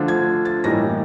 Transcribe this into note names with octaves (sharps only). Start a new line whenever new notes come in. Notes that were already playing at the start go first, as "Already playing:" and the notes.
Already playing: D3 F3 A3 D4 F4
G#6
A6
A2 E3 G3 A#3 D#4 A#6